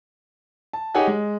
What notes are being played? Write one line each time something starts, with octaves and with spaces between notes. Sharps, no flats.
A5
D#4 G4 G#4 C#5 F#5 G#5
G#3